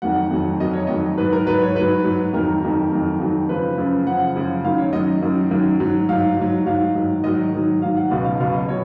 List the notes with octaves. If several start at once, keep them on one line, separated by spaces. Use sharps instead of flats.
F2 D#3 F#3 F#5
F2 D#3 F#3
F2 D#3 F#3 D#5
C#5
F2 D#3 F#3 D#5
G#2 F#3 B4
A#4
G#2 F#3 B4
C#5
G#2 F#3 B4
G#2 F#3
F2 D#3 F#3 A#4
F2 D#3 F#3
F2 D#3 F#3
F2 D#3 F#3
F#2 C#3 F3 B4
F#2 C#3 F3
F#2 C#3 F3 F#5
F#2 C#3 F3
F#2 D#3 F#3 F5
C#5
F#2 D#3 F#3 D#5
F#2 D#3 F#3
F#2 D#3 F#3
G#2 F#3
G#2 F#3 F5
G#2 F#3
G#2 F#3 F5
G#2 D#3 F#3
G#2 D#3 F#3 D#5
G#2 D#3 F#3
G#2 D#3 F#3 F5
F#5
C#2 B2 F#3 F5
F5
C#2 B2 F#3 F5
D#5
B2 F#3 C#5